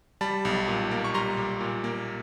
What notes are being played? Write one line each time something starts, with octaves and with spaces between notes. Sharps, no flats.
G3 A5 B5
B1
A#2
A#3
C#6
G3 A#5 C6
B1
A#2
A#3